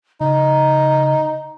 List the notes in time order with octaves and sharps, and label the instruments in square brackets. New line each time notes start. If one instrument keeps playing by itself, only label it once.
[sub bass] C#3 [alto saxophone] D#4 [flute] A#5